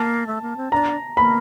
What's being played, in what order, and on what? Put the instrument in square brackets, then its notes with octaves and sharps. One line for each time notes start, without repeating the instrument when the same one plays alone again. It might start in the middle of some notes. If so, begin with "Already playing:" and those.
Already playing: [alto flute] A#3 [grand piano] A5
[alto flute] A3
A#3
C4
[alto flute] D4 [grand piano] A#5
[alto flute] A#3 [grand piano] B5